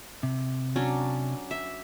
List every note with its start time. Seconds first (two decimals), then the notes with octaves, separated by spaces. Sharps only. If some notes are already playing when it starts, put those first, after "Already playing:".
0.23 C3
0.76 F#3 C#4 D4
1.51 E5